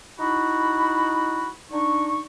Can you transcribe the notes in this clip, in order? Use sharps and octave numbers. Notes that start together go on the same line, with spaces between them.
D#4 E4 F#4 B5
D4 D#4 C#6